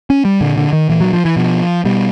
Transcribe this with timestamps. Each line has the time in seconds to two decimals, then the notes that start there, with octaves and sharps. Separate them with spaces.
0.10 C#4
0.25 G3
0.41 A#2 D3
0.58 D3
0.73 D#3
0.89 A#2 E3
1.01 F#3
1.13 F3
1.25 E3
1.36 B2 F3
1.85 B2 G3